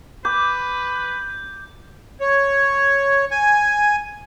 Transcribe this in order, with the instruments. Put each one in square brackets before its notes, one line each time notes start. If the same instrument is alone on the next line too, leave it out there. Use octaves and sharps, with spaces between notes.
[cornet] B4 [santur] D6 [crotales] G6
[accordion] C#5
G#5